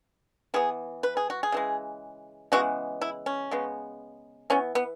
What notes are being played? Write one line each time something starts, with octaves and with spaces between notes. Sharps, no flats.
E3 B3 G#4
B4
G#4
F#4
G#4
C#3 E3 G#3
C#3 E3 G#3 B3 F#4
E4
C#4
C#3 G#3 B3
E3 B3 C#4
B3